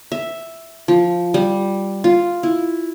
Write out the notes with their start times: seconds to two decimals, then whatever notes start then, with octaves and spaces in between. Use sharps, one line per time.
0.12 E5
0.88 F3
1.34 G3
2.04 F4
2.43 E4